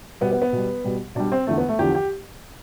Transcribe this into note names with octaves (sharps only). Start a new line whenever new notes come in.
B2 G3 B3
B3
B3
B2 G3
B2 G3
B2 G3 D4
C4
E2 D3 F3 A3
B3
A3
E2 D3 F3 G4
G4